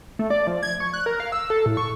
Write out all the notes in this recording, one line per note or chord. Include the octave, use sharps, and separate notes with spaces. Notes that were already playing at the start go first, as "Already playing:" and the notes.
A3
D5
F3
G#6
C#6
F#6
A#4
F5
E6
A4
A2
C#6